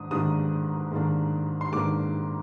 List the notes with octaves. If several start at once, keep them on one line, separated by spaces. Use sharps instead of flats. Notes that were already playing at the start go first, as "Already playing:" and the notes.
Already playing: G#2 D#3 D4 D#6
G#2 D#3 A#3 D4 D#6
G#2 D#3 A#3 D4
C6
G#2 D#3 A#3 D4 D6